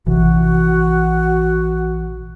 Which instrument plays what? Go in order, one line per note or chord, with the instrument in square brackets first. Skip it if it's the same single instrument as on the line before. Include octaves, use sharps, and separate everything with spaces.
[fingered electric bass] A#1 C3 E3 [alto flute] F#4